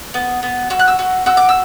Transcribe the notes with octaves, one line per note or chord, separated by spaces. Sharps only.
B3
B3
F#4 E6
F#6
E6
F#4
F#4 E6
D6
E6